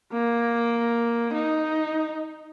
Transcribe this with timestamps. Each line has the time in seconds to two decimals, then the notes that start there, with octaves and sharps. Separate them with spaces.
0.13 A#3
1.34 D#4